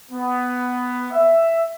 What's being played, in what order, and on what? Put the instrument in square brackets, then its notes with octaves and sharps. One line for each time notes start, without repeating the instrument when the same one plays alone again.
[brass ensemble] B3
E5